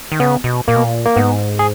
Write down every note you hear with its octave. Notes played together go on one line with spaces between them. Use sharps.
D#3
C#3 B3
B2
A#2 A#3
B2
A#2
A#3
G#2 B3
G#4